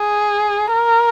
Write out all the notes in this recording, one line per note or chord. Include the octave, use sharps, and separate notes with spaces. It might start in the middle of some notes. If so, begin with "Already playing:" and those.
Already playing: G#4
A#4